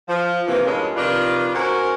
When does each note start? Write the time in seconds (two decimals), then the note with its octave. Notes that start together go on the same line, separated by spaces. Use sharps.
0.08 F3
0.47 C3 D#3 E3 A#3
0.65 E2 G2 A#2 G#3 C#4
0.96 C3 D#3 F3 D4 F4 B4
1.54 C#4 D#4 F#4 A#4 C5